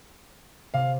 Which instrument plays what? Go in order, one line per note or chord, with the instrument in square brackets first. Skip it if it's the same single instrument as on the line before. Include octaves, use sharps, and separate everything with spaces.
[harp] C3 [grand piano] F5